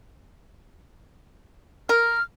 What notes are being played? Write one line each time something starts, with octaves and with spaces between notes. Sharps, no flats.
A#4 F6